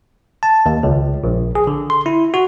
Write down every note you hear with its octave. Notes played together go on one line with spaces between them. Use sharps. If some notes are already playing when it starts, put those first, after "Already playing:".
A5
D#2
C#2
A#1
G#4
D3
C6
E4
F#4